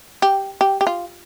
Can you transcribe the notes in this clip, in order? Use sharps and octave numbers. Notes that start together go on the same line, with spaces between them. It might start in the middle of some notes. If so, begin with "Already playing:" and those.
G4
G4
G4
F4